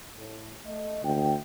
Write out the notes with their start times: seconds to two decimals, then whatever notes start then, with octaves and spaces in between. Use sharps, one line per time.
0.15 A2
0.65 A3 D#5
1.04 D2 G5